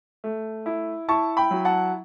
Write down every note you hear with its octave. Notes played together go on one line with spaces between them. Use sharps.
A3
E4
E4 A5 C#6
G5 B5
F#3
F#5 A5